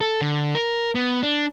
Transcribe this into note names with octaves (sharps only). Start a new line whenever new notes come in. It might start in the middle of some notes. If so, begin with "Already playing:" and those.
A4
D3
A#4
B3
D4